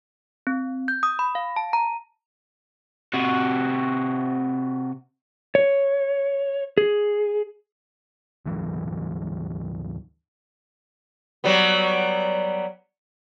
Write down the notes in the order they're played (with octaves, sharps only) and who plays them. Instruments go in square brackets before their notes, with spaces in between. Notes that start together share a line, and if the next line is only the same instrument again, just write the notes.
[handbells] C4
G6
D#6
B5
F5
A5
A#5
[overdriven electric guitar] C3 F#4
[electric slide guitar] C#5
G#4
[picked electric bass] D2 G#2 E3 F#3
[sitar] F#3 G3 B3